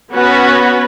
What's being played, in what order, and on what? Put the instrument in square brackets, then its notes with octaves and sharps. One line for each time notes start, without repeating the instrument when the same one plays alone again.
[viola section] B3 C#4 B4 [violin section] F#4